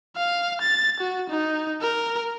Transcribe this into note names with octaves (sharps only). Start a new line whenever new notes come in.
F5
A6
F#4
D#4
A#4